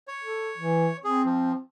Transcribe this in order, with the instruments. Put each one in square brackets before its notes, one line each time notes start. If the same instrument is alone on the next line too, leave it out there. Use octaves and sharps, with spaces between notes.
[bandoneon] C#5
[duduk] A4
E3
[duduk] C4 [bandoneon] G#4
[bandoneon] F3